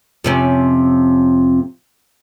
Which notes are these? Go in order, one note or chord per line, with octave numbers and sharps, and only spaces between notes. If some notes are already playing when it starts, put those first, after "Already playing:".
F2 C3 C#4